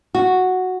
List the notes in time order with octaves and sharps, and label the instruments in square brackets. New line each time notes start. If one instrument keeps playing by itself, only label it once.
[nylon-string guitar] F#4